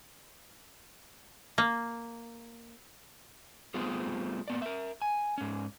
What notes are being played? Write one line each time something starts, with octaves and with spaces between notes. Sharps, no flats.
A#3
G3 A3 B3 C4 F4 G#4
A#3 B3 D5
A#4 E5
G#5
G#2 C#4